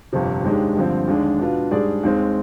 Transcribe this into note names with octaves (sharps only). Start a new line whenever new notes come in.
G1 F2 C3
D#2 D#3 G#3 D4 G4
G2 D3 F3 C4
D#2 D3 G#3 D4
B2 B3 D4 F4
G#2 G3 D4 G#4 D5
D#2 D#3 G#3 C4